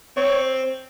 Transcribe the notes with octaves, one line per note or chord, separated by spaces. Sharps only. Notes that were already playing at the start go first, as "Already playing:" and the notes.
C4 C#5